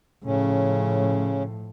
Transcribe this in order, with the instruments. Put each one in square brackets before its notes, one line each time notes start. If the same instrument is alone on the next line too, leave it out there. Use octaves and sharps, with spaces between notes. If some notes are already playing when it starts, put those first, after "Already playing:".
[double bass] A2 F3 [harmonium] C#3 C#4